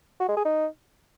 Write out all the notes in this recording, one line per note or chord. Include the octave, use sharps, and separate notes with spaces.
F#4
G#3
G#4
D#4